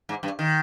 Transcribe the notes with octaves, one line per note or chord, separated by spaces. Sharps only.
G#2
G2
D#3